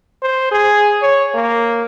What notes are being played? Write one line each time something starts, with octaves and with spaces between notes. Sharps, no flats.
C5
G#4
C#5
A#3